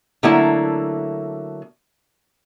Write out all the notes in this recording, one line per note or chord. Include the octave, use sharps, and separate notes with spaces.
D3 F#3 A3 A#3 E4